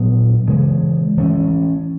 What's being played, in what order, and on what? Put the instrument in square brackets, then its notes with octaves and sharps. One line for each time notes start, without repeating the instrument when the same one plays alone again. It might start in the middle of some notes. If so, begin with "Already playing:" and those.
Already playing: [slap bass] A#2 F#3 B3 D4
C#3 E3 G#3
E3 A3 C#4